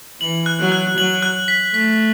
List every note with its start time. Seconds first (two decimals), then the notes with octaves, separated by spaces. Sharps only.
0.20 E3 F#7
0.46 F#6
0.59 F#3
0.72 F#6
0.97 F#3 F#7
1.22 F#6
1.48 B6
1.74 A3 B6